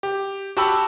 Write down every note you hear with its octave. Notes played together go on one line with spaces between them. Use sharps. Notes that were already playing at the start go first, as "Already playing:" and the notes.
G4
F#4 G4 F#5 A5 B5 E6